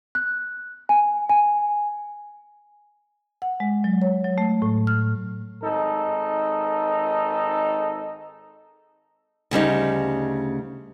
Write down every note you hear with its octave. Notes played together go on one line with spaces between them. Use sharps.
F#6
G#5
G#5
F#5
G#3
F#3
C#5
F#3
A3
A2
F6
G#1 D#4 A4
D2 C#3 G3 D#4